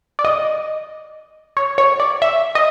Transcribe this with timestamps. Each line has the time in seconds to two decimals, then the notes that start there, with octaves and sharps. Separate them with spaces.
0.19 D5
0.25 D#5
1.57 C#5
1.78 C#5
2.00 D5
2.22 E5
2.55 D#5